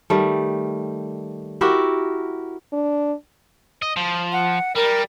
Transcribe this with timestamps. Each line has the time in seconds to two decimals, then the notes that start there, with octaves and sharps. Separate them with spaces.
0.10 D#3 G3 A3
1.61 E4 F#4 G4 A#4
2.73 D4
3.82 D#5
3.97 F3
4.32 F#5
4.76 G3 A#4